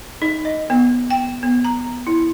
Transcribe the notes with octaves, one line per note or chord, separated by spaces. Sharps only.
D#4
D#5
B3
G5
B3
A#5
E4